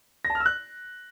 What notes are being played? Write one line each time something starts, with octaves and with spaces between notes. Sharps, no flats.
A#6
A5
F6
E6
F#6